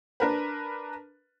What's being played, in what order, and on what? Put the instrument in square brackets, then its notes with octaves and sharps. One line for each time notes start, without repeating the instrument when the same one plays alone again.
[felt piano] D4 A#4 B4